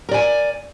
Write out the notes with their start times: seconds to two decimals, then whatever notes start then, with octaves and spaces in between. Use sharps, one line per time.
0.09 A#4
0.11 D5
0.14 G#5